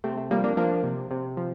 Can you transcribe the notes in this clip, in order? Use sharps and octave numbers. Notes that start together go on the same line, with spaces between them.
C3 A3 C4
A3
F3 G3 A#3
A#3 D4
F3 A#3 D4
C3
C3
F3